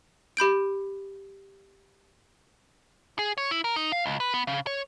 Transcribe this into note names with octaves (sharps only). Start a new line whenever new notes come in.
G4 B5 G6 D7
G#4
C#5
E4
A#4
D#4
F5
C#2
B4
B3
C#3
C#5